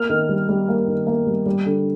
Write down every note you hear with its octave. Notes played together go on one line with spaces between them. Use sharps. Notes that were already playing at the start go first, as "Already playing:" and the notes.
Already playing: A#3 F6
D#3
G3
G3
A#3
D#3
A#3
G3
G3
D3